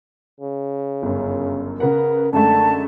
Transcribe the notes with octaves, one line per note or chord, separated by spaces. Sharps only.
C#3
G1 F#2
C#3 A#4 B4 F#5
F#2 D3 G#3 A3 A5